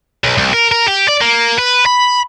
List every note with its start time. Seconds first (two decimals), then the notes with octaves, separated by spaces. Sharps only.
0.24 B1
0.37 C2
0.53 A#4
0.72 A#4
0.88 G4
1.09 D5
1.22 A#3
1.58 B4
1.86 B5